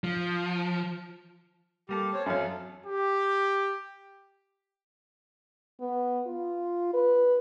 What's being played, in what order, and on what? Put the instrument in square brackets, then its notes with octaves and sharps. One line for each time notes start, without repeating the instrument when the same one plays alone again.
[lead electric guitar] F3
[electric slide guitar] G3 A#3 A4 [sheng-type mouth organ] G4
[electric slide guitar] C4 [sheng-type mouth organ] C5 C#5
[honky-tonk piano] F#2 F#3 [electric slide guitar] A4 [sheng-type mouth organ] F5
[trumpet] G4
[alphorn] B3
F4
B4